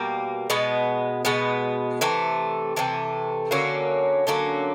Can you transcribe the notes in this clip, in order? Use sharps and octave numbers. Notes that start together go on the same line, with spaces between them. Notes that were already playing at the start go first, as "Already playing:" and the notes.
Already playing: B2 G3 A#3
B2 G#3 B3
B2 G#3 B3
C3 E3 A3
C3 E3 A3
D3 F#3 A#3 C#4
D3 F#3 A#3 C#4